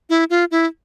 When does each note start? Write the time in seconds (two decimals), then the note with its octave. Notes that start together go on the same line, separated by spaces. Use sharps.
0.10 E4
0.30 F4
0.51 E4